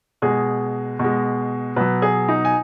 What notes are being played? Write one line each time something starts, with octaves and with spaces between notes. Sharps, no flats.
B2 G#3 G#4
B2
G#3
B2 F#3 B4
G#4
D#4
G#5